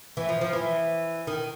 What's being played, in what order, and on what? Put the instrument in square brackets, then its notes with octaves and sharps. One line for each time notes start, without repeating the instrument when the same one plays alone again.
[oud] E3
F3
F3
E3
D#3